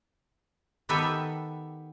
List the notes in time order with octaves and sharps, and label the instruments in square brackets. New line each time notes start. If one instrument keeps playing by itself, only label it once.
[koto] D#3 B3 G4 A4 B4 E5